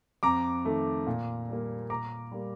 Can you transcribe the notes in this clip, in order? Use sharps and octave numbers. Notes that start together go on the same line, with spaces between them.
F2 A#5 D6
D#3 A3
A#2
G3 A#3
A#2 A#5 D6
G3 A#3